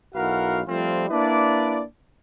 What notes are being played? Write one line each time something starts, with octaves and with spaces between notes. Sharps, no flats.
B1 E4 F#4 A#4 F5 F#5
F3 G3 A3 C4 F4
A#3 D4 E4 B4 D5